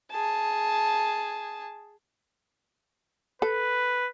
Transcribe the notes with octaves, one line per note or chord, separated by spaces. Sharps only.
G#4 A5
A4 B4